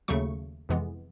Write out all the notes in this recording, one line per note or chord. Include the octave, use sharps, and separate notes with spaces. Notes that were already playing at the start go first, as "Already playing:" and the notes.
D#2 C#3 F#3 A3 C#6
F2 C3 E3 G#3 B3